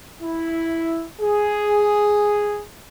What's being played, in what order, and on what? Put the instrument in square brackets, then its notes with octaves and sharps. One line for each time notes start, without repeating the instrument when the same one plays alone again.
[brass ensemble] E4
G#4